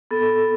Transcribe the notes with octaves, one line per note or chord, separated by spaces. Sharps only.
B3 A4